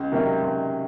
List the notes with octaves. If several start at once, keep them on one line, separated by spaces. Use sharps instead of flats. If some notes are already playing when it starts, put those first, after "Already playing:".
Already playing: C#2
C3 D#3 F#3 A#3
C#2